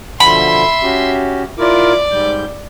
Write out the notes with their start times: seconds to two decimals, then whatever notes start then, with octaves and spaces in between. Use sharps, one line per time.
0.20 B2 D3 F3 E5 B5 C6
0.83 C#4 F#4 G4
1.59 E4 F4 A#4 D5
2.11 G#2 G3 G6